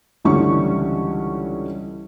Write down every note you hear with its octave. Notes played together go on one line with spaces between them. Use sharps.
C#2 D3 E3 G3 C#4 C#6